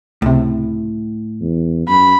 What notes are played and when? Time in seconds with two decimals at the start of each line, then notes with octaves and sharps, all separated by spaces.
0.22 C#2 A2 C3
1.40 E2
1.88 F#2 B5